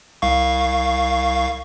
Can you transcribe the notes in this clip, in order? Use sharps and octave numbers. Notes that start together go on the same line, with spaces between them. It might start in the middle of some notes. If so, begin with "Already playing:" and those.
C2 F5 C#6